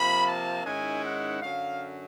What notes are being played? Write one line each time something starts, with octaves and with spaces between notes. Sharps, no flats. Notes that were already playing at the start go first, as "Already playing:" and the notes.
Already playing: C3 F3 A#3 B5
A5
G#2 D#3 G#3 C#4 E4 G#5
F#5
F#2 D3 F#3 F5